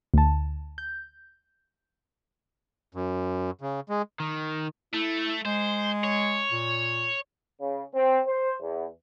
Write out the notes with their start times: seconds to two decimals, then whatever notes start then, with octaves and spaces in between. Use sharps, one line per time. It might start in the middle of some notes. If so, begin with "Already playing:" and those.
0.14 D2 A5
0.78 G6
2.95 F#2
3.61 C#3
3.89 G#3
4.20 D#3
4.93 A3 E4
5.45 G#3 C5
6.04 C#5
6.51 A#2
7.59 C#3
7.94 C4
8.26 C5
8.61 E2